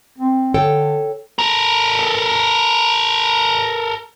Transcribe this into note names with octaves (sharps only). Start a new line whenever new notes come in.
C4
D3 A4 C#5 G5
A4 A#4